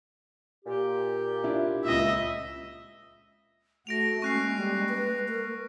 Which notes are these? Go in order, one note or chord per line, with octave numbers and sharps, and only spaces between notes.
A#2 G4
D4 E4 F4
C#2 A#2 D#5 E5
A3 F#4 A#6 D7 F7
G#3 A#3 C#4 C#6 F#6 C7
G3
B4
A#4